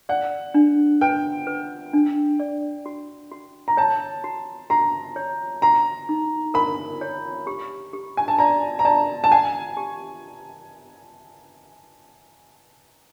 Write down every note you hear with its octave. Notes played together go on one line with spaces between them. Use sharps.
D5 F#5
D4
B4 G5
B4
D4
D5
F#4
F#4
A#5
C#5 A5
F#4
F#4 A#5
C#5
F#4 A#5
D#4
A#4 B5
C#5
G4
G4
G#5
A5
D5 A#5
A#5
D5 A5
A5
F#5 G#5
G4